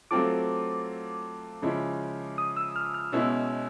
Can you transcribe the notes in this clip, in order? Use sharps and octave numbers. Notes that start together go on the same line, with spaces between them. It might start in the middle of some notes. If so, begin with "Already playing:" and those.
F#3 A3 C4 F4 A4 D6
C#3 F3 G#3 C#4 E4
D#6
E6
F6
F6
B2 G#3 C#4 E4 E6